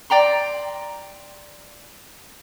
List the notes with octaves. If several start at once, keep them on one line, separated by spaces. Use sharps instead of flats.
D5 G5 A#5 C6